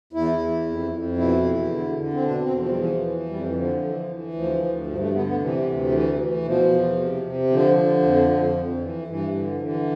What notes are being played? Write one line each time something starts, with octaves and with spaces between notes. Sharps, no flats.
E2 E4
E2
F2
F2
B2 E4
E2
D3
D3
C4
B2 D4
C4
E2
F3
G3
E3 F3
E3
F2 G3
F3
E3
D3 F3
E3
E3
D2 F3
D2
G2 F3
A3
D3 B3
B3
C3 E3
D2
E3
E3
B2 F3
E2
C3
C3
D3 F3
D3
F2
F2
F2
E3
G2 E3
D3
F3
D3 E3